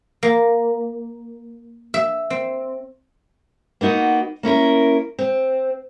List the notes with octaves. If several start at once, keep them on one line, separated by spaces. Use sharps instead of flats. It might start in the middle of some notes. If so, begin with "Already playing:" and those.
A#3
E5
C4
A#3 B3 D#4 F#4
A#3 C#4 E4 A#4
C4